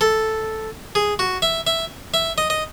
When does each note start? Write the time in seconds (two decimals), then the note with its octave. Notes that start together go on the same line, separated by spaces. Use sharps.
0.01 A4
0.95 G#4
1.19 F#4
1.42 E5
1.67 E5
2.14 E5
2.38 D#5
2.50 D#5